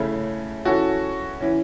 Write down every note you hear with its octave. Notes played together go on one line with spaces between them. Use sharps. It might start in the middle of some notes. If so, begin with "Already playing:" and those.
Already playing: C#3 A3 C#4 E4
E3 C#4 F#4 A4
E3 C#4